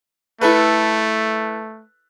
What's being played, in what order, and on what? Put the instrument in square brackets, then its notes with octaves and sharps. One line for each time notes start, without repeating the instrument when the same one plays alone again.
[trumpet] A3 [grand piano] E4 A4 B4